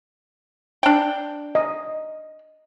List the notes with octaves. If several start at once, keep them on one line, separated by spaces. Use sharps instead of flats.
D4 G5
D#5